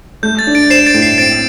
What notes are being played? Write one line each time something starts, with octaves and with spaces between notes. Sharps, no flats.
A3 G6
A6
D4
A6 D7
C5 C7 E7
A6 D7
A2
C7
C4 A6 D7